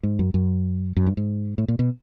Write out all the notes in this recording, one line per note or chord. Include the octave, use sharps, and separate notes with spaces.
G#2
F#2
F#2
F#2
G2
G#2
A2
A#2
B2